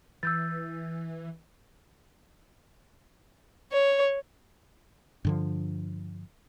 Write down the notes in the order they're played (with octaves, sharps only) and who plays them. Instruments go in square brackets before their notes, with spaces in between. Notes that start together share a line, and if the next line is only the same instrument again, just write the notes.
[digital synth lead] E3 [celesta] E6 G6 A6
[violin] C#5
[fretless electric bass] G2 D3 F3